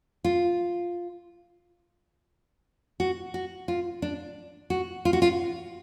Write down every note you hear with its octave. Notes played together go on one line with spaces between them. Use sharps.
F4
F#4
F#4
F4
D4
F#4
F4
F#4
F4